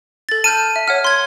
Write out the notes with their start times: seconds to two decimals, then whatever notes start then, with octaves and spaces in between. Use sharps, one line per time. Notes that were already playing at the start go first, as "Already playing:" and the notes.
0.29 A4 A6
0.44 A5 F6 G6 D#7
0.76 E5
0.88 C#5 F#5 F6
1.04 C6 G#6